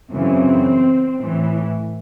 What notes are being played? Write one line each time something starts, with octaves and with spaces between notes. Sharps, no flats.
F#2 C#3 E3 C4
A2 E3